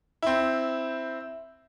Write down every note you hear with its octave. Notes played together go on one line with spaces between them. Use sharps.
C4 E4